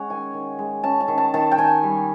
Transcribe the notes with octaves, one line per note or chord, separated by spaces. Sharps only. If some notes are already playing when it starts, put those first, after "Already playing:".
Already playing: G#3 C#4 C#5 F#5
D#3 G#5
D#3
G#3
C#4 A5
A5
D#3
A5
D#3 A5
G5
D#3 G#5
G3